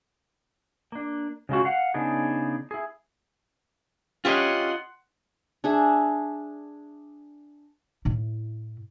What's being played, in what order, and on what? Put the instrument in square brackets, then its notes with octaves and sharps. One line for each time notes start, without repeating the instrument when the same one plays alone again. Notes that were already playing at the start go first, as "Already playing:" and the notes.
[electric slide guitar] A#3 D4
C#3 G#3 F4 F#4
F5 F#5
C#3 B3 D4 D#4 G#4
E4 G#4
[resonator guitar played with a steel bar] C#4 G4 C#5 [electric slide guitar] F4 D#5 [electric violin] F#5 C6
[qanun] D4 G#4 E5
[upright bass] A2 E4